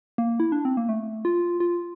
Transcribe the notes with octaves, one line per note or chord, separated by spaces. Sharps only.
A#3
E4
D4
C4
A#3
A3
F4
F4